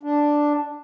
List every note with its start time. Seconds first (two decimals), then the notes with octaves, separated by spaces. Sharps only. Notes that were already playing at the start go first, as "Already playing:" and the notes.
0.03 D4